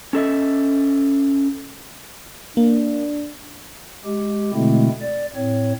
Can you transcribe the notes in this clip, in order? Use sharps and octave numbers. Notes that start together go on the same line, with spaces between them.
C#4 A4 D#5 E5
A#3 D4
G#3 G4
B2 D3 G#3 A3 C4 E4
D5
A2 C4 C#5